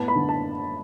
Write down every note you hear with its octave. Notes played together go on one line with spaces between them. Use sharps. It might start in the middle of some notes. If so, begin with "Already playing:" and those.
Already playing: A2 B3 A5
B5
D3
A5